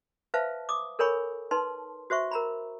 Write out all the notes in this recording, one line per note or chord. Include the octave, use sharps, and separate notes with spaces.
B4 C5 E5 F5 A5
D6 D#6
A4 A#4 C#5 G#5 B5 C#6
D#4 B4 A5 C6
F#4 C5 E5 C#6
A#4 A#5 B5